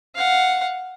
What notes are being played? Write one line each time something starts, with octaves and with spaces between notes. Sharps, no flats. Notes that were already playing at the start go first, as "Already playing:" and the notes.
F5 F#5